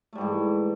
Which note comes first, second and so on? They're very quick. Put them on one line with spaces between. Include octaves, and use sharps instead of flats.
A3 G3 G#2 E3